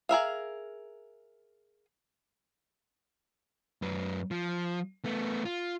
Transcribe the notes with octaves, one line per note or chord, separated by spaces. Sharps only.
G#4 A#4 E5 F5
F#2 B4
F3
A3 B3
F4